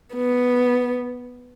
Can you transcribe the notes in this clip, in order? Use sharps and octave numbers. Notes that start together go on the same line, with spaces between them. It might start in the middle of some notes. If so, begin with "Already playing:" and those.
B3